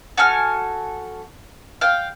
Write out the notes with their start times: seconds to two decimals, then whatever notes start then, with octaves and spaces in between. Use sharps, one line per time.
0.18 F#4 A4 G#5 F6
1.81 F5 G5